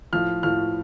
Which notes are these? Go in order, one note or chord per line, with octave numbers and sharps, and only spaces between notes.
A2 F3 F6
A2 F3 F6